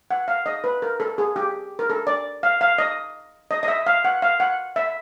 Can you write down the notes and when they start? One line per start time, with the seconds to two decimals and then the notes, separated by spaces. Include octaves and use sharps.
0.11 F#5
0.28 F5
0.46 D#5
0.64 B4
0.82 A#4
1.00 A4
1.18 G#4
1.36 G4
1.79 A#4
1.90 A4
2.07 D5
2.43 F5
2.61 F5
2.78 D#5
3.51 D#5
3.63 D#5
3.68 E5
3.86 F5
4.05 F#5
4.22 F5
4.40 F#5
4.76 E5